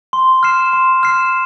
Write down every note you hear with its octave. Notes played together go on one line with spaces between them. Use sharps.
C6
F6 C7 E7
C6
F6 C7 E7